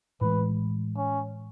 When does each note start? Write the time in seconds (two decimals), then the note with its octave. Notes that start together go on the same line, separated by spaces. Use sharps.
0.21 A2 E3 G#3 B4
0.97 C#4